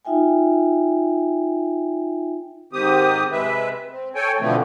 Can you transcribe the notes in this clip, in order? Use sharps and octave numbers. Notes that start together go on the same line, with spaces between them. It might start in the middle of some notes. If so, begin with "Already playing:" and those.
D#4 F4 E5 G5 G#5
G#2 D#3 C4 G4 D#6
C3 G#3 B4 E5
C4
A4 C#5 G5 G#5
B2 D3 E3 F3 A3 C4